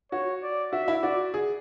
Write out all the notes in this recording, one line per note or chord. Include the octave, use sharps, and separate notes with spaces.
F#4 C#5
D5
F#4 E5
E4
F#4 D5
G#4